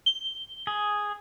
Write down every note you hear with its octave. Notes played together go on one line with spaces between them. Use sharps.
G7
G#4